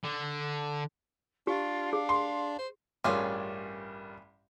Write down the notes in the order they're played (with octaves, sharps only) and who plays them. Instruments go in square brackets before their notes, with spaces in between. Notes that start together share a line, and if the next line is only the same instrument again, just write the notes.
[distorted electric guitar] D3
[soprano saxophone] D4 [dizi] F4 [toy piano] G4
[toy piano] G#4 [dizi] F5
[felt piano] C6
[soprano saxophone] C5
[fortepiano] A1 G2 G3 [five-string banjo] C#4 F4 G#4 [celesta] A#4 D6